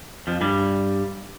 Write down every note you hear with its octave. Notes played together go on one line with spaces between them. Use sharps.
F2 F3
G2 G3